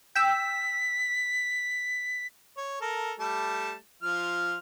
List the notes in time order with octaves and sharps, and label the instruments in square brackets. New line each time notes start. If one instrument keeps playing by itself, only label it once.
[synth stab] G5 E6 [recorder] B6
[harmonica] C#5
A4 A#4
G3 A3 A5
F3 F4 F6